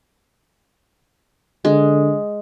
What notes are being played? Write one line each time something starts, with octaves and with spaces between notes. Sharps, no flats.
D3 G#3